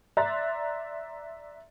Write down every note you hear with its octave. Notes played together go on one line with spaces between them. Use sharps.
D5 E5 A#5 C6 F#6 A6